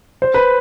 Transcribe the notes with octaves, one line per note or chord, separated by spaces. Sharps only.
C5
B4